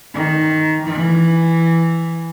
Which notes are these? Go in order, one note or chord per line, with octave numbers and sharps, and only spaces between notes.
D#3
E3